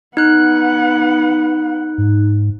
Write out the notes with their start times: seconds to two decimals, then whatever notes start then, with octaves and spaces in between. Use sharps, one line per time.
0.17 B3 D#4 F#5 F#6
1.98 G#2